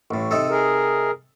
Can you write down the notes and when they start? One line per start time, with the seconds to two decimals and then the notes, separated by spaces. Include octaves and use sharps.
0.11 A1 A2
0.31 C3 D#4 A4
0.49 G#4 A#4